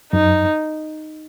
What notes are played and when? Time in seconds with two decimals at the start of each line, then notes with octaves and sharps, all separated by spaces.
0.12 F#2 D#4